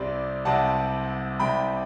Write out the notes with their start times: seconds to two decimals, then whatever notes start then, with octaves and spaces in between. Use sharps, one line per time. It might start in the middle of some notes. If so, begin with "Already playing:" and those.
Already playing: C2 C3 G3 D5
0.45 C2 C3 G3 F#5 A5
1.40 C2 C3 G3 G5 B5